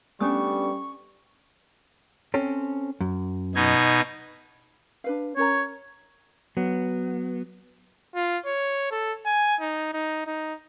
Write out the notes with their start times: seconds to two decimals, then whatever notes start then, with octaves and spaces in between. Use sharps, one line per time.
0.21 G3 A3 B3 C#4 D4 G#5 C#6 D#6
2.34 C4 C#4 A4
3.00 F#2
3.55 B2 D#4 G#6
5.04 D4 B4 F5
5.37 C#4 A#4 C#5 A#5
6.57 F#3 B3
8.15 F4
8.46 C#5
8.91 A4
9.26 G#5
9.61 D#4
9.93 D#4
10.27 D#4